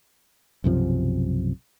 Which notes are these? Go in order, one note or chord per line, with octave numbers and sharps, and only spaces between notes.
B1 F#2 C3 F3